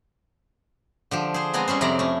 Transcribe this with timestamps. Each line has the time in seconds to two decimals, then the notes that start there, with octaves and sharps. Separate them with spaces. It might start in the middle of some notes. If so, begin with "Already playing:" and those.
1.11 D3 F3 G4
1.34 G#4 C5
1.54 G#3 B3 C4 G#5 A#5
1.68 G3 C#4 G#4 C5
1.81 F2 C3 E4 D5 A#5
1.99 A3 C#4